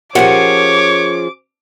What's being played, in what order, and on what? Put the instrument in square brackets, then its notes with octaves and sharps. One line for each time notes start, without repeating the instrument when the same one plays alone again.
[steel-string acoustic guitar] F3 C#4 G#4 [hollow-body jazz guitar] G4 A#4 F#5 [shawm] C#5 [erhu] D6